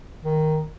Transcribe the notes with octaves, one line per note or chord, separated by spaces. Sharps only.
D#3